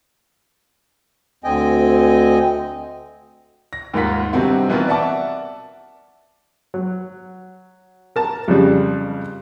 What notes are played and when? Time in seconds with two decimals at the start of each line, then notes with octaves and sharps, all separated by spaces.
1.44 D2 D3 C4 D#5 G5 G#5
3.73 A#6
3.94 D#2 G#2 A#3 F4 F#5 B6
4.33 G2 C3 D#3 C4 F#4
4.69 B2 E3 B3 C4 F4 A#4
4.88 D5 E5 F#5 A5 D6
6.74 F#3
8.16 A#4 A5 A#5
8.48 F2 C#3 G3